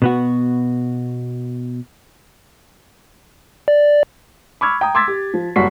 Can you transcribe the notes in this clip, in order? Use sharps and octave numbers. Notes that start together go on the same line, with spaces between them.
B2 B3 F#4
D5
B5 C#6 D6 E6 F6 G#6
G5 A#5 D#6
C6 D6 E6 G#6 A6 B6
G4
F3
F#1 G3 F#4 C#6 B6 C7